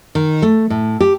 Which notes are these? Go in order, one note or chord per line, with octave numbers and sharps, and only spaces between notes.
D#3
A3
A2
G4